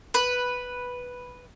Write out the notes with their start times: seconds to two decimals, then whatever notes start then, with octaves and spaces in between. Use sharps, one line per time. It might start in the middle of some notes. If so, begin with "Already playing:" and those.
0.14 B4